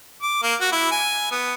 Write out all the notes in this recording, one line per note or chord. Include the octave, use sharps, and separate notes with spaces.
D6
A#3
F#4
E4
G#5
B3